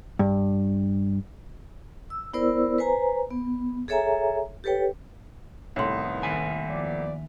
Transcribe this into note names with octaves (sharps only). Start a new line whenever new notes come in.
G2
E6
B3 E4 A#4 C5 D5 E6
B4 C5 G#5 A#5
B3
G#4 A4 C#5 E5 G#5 A#5
G4 A4 B4 C#5 G5
C2 A2 D#3 A3 B3 C#5 C6
D#2 E5 G#5
F3 B3 D5